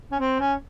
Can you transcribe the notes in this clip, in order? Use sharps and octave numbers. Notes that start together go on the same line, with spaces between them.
C#4
C4
C#4